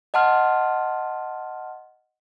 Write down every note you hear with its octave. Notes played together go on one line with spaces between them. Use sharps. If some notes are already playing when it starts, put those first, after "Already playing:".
D#5 F#5 A5 C6 F6